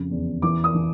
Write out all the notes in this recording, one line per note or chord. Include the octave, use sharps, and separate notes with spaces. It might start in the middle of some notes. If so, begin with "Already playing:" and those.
Already playing: F2 C#3
E2
E3 D6
D#6
E3